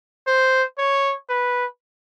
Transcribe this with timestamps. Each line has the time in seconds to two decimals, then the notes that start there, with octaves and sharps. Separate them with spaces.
0.27 C5
0.78 C#5
1.29 B4